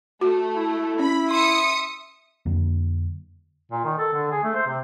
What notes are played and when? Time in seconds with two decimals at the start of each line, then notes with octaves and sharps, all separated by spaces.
0.21 A3 F#4
0.56 E4
0.99 C#4 B5
1.31 E5 C6 D#6 C#7
2.46 F2 D3 F#3 A#3
3.72 A#2
3.85 D#3
3.99 A4
4.13 D3
4.31 G#4
4.43 A3
4.55 C5
4.67 C3